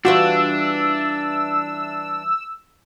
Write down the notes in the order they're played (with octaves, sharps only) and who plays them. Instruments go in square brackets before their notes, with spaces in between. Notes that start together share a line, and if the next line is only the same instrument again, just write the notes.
[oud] E3 G3 F4 [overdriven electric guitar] D4 [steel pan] F#4 [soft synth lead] E6